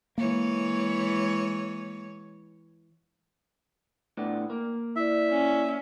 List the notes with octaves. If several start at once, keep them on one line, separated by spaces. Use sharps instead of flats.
E3 G#3 A#3 C#5
A2 B3 D4 G5
A#3
E4 D5 E5
C#4